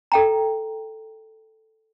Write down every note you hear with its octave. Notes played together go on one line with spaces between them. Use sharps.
A4 G5 A#5